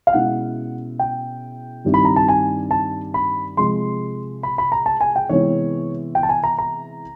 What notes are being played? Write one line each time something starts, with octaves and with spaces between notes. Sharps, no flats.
F5
B2 G#3 C#4 E4 F#5
G5
G2 D#3 G3 C4 E4
B5
A#5
A5
G#5
A5
B5
C3 F3 G#3 C6
B5
B5
A#5
A5
G#5
G5
C3 E3 G#3 B3 E4 C#5
G5
A5
G#5
A#5
A#5